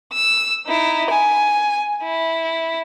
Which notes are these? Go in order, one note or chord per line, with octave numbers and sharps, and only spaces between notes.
E6
D#4 E4
G#5
E4